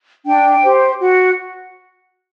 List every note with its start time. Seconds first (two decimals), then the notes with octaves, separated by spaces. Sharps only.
0.25 D4 G5
0.63 G4 C5
1.00 F#4